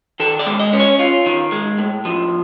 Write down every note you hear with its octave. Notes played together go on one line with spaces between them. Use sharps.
D#3 A4
D5
G#3
D#5
C#4
C#5
F4
D#3
G#3
A2
F3